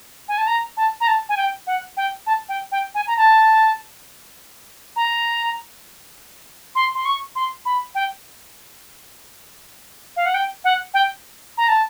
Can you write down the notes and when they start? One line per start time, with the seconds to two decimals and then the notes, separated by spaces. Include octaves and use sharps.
0.28 G#5
0.38 A5
0.47 A#5
0.77 A5
1.01 A#5
1.07 A5
1.29 G#5
1.37 G5
1.67 F#5
1.97 G5
2.27 A5
2.49 G5
2.72 G5
2.95 G#5
3.07 A#5
3.17 A5
4.96 A#5
6.75 C6
6.95 C6
7.05 C#6
7.35 C6
7.65 B5
7.95 G5
10.16 F5
10.26 F#5
10.34 G5
10.64 F#5
10.94 G5
11.58 A#5
11.68 A5